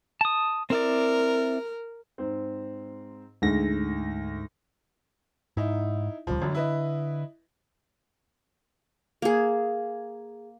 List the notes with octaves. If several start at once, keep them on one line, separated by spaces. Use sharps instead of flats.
A5 D#6
C4 E4 A#4 D5
G#2 C4
D2 G#2 A#6
G#2 D#4 E4
D#1 C#2 F3 G3
A1 F#2 D3
E4 B4 D#5
A#3 G#4